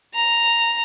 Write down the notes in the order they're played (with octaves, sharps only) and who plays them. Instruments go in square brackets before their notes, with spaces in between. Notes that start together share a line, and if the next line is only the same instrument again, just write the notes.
[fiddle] A#5